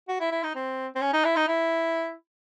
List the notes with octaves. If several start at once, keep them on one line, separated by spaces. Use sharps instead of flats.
F#4
E4
E4
D#4
C4
C4
C#4
D#4
E4
D#4
E4